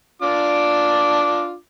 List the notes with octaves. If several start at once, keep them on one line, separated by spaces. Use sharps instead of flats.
D4 F4 D6